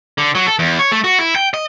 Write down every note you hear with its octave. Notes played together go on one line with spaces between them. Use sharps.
D3
F#3
A4
E2
C#5
A3
F#4
E4
G5
D#5